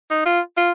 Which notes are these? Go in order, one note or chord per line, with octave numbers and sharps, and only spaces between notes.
D#4
F4
F4